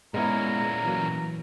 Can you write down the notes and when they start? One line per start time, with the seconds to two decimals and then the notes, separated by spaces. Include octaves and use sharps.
0.14 A#2 G#3 B3 C#4 E4 A#5
0.85 E3 F#3 A#3